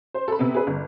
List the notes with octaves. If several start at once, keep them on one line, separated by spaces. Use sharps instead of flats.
C5
A4 B5
C3 B3
G#4 B4
G1